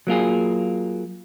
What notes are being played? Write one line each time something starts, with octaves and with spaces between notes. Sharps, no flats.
F#3 A#3 F4 G#4